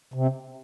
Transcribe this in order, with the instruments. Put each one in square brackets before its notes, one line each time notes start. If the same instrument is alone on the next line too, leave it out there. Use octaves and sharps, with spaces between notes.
[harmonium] C3